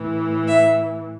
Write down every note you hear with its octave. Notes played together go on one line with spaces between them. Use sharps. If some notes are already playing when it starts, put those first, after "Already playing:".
Already playing: A2 E3
E5